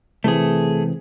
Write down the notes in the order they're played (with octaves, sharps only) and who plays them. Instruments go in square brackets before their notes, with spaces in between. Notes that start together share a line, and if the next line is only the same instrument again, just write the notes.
[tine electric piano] C3 E3 C4 [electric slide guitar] A3 G#4